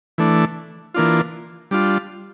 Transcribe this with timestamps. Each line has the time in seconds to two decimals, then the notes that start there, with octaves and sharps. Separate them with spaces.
0.18 E3 A3 D4
0.94 E3 A#3 D4 F4
1.71 G3 D4 F4